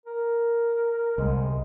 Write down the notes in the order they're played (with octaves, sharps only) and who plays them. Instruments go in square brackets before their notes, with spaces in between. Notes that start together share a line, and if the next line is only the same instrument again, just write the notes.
[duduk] A#4
[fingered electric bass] C2 [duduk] G#3